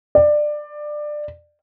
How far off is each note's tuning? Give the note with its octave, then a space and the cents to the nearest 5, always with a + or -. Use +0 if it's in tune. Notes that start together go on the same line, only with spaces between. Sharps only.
D5 +20